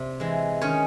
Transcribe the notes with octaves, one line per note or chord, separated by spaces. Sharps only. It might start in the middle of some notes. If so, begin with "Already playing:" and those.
Already playing: C3 D5
E3 G#3
D#3 C#4 C#5